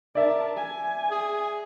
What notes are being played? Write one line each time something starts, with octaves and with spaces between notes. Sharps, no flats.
A#4 D5 E5 A5
G#5
G#4